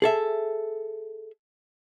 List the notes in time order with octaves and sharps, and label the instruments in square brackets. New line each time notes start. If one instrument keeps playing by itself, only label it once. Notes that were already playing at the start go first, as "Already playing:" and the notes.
[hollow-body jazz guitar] G#4 A4 E5